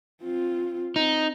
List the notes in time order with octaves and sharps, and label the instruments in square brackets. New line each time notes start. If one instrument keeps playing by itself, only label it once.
[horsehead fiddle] C4 F4
[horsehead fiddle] C4 [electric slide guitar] D#4